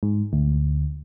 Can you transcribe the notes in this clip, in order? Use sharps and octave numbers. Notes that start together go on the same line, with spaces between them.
G#2
D2